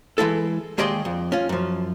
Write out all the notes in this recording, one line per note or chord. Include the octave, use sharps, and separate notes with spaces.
E3 G#3 E4 A4
D#2 G#3 G4 D5 D#5 C6
F2
C#4 F4
F#2 F3